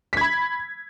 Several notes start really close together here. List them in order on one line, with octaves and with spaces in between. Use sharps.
B6 G#6 B5